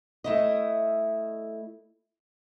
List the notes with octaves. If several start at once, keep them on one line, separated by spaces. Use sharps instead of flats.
A3 E4 D#5